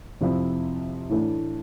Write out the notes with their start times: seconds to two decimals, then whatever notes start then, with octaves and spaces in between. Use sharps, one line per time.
0.21 F2 C3 F3 C4 E4
1.09 A2 E3 A3 D4